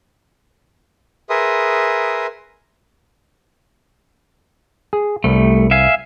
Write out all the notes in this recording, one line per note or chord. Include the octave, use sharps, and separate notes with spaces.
G#4 A#4 B4 E5 C6 D#6
G#4
C2 G3 A3
E5 F5 G#5